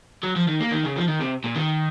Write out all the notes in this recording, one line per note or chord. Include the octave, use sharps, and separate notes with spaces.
F#3
F3
D#3
A#3
D#3
C#3
F3
D#3
C3
A#2
D#3